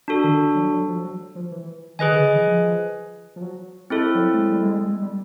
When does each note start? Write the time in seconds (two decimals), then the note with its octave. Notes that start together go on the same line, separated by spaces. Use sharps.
0.08 D4 F#4 A4
0.24 D#3
0.55 F#3
0.72 F#3
0.88 F3
1.04 F#3
1.35 F3
1.51 E3
1.99 D#3 G#4 B4 D#5 G#5
2.12 D3
2.35 E3
2.47 F3
3.36 F3
3.42 F#3
3.90 G#3 C4 E4 A4
4.15 F#3
4.34 A3
4.38 G#3
4.50 G3
4.62 G#3
4.74 G#3
4.85 G#3
5.02 G3